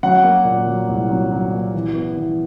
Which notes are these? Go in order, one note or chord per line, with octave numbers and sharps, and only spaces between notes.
F#3 F#5
A#3
A#2
F#3
C2
F#3
F#3
A#2
E3
B3
E3